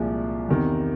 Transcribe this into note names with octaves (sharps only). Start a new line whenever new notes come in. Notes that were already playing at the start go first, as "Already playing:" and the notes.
Already playing: C2 A#2 F3 G#3
E2 C3 D#3